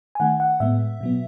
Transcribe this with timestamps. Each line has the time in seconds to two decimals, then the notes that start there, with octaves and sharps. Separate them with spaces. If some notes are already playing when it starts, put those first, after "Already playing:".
0.15 G#5
0.20 D#3 A3 F#5
0.40 F#5
0.60 A2 G#3 B3 E5
1.01 B2 F#3 B3